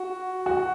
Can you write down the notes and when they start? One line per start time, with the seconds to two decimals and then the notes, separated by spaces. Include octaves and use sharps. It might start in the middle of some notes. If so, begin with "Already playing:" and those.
Already playing: F#4
0.46 F#4